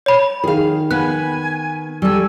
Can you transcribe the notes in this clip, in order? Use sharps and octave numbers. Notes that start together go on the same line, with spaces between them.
C#5 B5
D#3 G#4 F5
B3 B4 G#5 F#6
G3 A4 G#5 C#6 E6